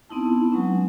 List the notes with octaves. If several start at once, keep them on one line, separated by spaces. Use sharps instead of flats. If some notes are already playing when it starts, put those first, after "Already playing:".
B3 C4 D#4 E4 A5
F#3 G#3 C4 C#4 B4